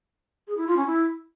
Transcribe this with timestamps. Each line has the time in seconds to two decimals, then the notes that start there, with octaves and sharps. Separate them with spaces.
0.47 G#4
0.57 E4
0.67 F4
0.77 C#4
0.86 E4